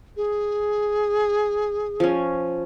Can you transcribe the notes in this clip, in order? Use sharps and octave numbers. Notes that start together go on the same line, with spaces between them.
G#4
F3 C#4